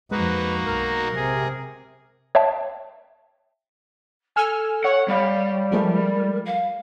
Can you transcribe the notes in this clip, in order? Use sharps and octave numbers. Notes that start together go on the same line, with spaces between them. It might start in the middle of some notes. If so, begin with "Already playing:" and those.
F2 G#3 A#3 D#4 F#4 B4
B1 A#4
C3 G#4
C#5 E5 F5 G5 A5
A4 G#5 E6 F6
C#5 F#5
G3 F5
F3 G#3 A3 A#4
F5